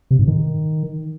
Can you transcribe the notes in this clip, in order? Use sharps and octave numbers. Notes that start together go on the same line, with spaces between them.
C3
G#2
D#3